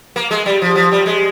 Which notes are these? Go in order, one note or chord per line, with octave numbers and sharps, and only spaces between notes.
A#3
G#3
G3
F3
F3
G3
G#3